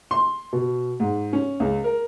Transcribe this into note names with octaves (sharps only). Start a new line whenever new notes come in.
C6
B2
G#2
C#4
C#2
A#4